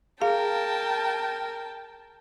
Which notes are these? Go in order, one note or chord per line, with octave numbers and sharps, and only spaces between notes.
G#4 A#4 F5 G5 A5